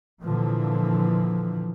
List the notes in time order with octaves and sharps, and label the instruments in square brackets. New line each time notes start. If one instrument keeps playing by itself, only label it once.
[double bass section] A#2 D3 E3 F3